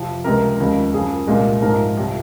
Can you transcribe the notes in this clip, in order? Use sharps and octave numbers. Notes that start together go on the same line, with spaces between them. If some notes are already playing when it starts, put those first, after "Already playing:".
Already playing: F2 C3 F3
C#2 C3 F3 G#3 A#4
D#2 C#3 F3 G#3
F#2 C#3 F3 G#4
C2 A#2 G#3
G#2 F3 G#3 A#4
C2 C3 F3